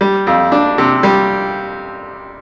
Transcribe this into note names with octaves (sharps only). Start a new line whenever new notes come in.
G3
F2
D4
C3
G3